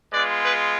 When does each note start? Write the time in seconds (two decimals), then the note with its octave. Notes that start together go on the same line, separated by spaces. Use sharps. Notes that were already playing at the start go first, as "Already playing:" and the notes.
0.13 G#3 B3 F4 B4 D5
0.43 G#4 B4